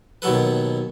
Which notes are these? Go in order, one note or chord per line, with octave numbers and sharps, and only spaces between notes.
D#2 B2 F#3 A4 B4